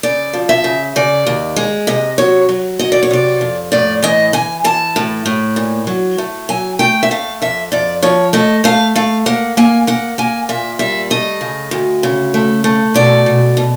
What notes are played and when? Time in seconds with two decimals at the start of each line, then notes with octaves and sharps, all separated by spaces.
0.03 C#3 D5
0.33 F3
0.49 E5
0.64 C#3
0.96 C#3 D5
1.27 D#2
1.56 G#3
1.87 C3 D#5
2.18 F#3 C#5
2.49 F#3
2.79 F#3 D#5
2.92 D5
3.03 C#5
3.11 C3 D5
3.41 F2
3.72 A2 D5
4.02 E3 D#5
4.33 E3 G#5
4.64 E3 A5
4.96 A2
5.26 A2
5.56 A#2
5.87 F#3
6.18 A3
6.49 F#3 G#5
6.79 A3 G5
7.03 E5
7.11 A3 F5
7.42 F2 E5
7.72 F2 D5
8.02 F3 C#5
8.33 A3 D#5
8.64 A3 F5
8.95 A3 F5
9.26 A#3 F#5
9.57 A#3 G#5
9.87 A#3 F#5
10.18 A#3 G#5
10.49 A#2 E5
10.79 G3 E5
11.10 A3 D#5
11.41 C#3
11.71 D2
12.03 C#3
12.34 A3
12.64 A3
12.94 B2 D5
13.26 B2
13.57 B2